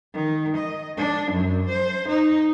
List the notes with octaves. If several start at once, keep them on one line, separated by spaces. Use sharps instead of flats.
D#3
D#5
D4
F#2
C5
D#4